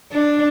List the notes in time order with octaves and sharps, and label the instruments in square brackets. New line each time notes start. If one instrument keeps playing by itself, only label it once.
[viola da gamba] D4